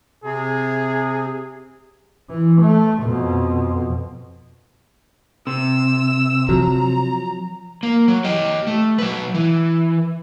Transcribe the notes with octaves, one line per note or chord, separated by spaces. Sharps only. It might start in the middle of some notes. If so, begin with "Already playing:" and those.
C3 G#4
E3
A3
F2 B2
C3 E6
F3 F#3 A#5
A#3
F#3
G4 D#5
A3
F#3 B4
E3